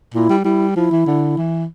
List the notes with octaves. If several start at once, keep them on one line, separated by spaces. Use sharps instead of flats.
A#2 E4
G3
G3 E4
F3 E4
E3
D3
E3